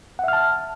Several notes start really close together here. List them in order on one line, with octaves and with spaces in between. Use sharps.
F#5 E5 F6 A5